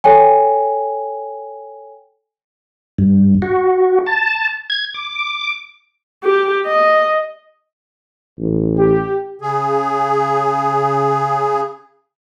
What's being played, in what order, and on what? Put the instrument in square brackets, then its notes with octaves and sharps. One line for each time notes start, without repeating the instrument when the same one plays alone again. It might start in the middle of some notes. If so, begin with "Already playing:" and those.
[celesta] A4 C#5 G5 G#5
[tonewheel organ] G2
F#4
A5
G#6
D6
[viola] G4
D#5
[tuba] A1
[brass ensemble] G4
[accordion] C#3 G#4